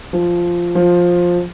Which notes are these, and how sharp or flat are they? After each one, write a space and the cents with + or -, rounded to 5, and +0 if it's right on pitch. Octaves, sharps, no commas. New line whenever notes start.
F3 -5
F3 +10